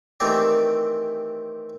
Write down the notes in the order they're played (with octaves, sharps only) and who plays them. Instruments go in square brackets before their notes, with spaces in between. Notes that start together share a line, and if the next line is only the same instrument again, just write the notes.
[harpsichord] D#3 E3 A3 C4 G4 D5